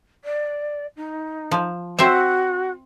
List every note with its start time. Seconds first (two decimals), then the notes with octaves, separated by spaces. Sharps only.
0.25 D5
0.97 D#4
1.51 F3
1.99 C4 F#4 C5 E5